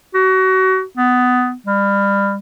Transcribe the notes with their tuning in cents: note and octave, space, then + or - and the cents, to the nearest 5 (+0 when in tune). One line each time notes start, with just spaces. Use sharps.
F#4 +30
B3 +15
G3 +30